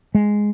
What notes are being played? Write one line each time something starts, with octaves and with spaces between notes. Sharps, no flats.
G#3